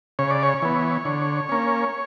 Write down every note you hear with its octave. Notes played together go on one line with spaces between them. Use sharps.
C#3 C#5
D5
C#5
E3 B3
D3
A#3 C#4